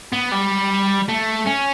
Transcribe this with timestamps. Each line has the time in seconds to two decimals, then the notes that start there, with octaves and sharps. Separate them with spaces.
0.13 B3
0.32 G3
1.09 A3
1.47 C#4